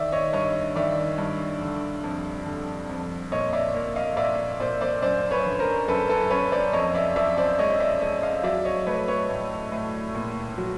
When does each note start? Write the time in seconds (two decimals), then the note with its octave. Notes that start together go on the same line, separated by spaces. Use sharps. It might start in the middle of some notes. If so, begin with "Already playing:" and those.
Already playing: D#3 D5 E5
0.12 C#5 D#5
0.33 G2 C#5 D#5
0.76 D#3 D5 E5
1.18 G2
1.61 D3
2.03 F2
2.46 D3
2.89 F2
3.32 A#2 C#5 D#5
3.53 D5 E5
3.75 A#3
3.96 D#5 F5
4.17 A#2 D5 E5
4.60 A#2 C5 D5
4.81 C5 D5
5.02 F#2 C5 D5
5.31 B4 C#5
5.46 D3
5.59 A#4 C5
5.88 F#2 A4 B4
6.09 A4 B4
6.30 F#2 B4 C#5
6.51 C5 D5
6.73 F2 C#5 D#5
6.95 D5 E5
7.16 F3 D5 E5
7.37 C5 D5
7.59 G#3 C#5 D#5
7.80 D5 E5
8.01 G#3 C#5 D#5
8.22 D#5 F5
8.43 F#3 D5 E5
8.65 C#5 D#5
8.87 A3 B4 C#5
9.08 B4 C#5
9.29 A2
9.72 A2
10.15 A#2
10.58 F#3